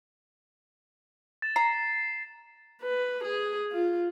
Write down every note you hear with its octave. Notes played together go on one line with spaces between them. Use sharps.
A6 E7
A#5 C7
B4
G#4
F4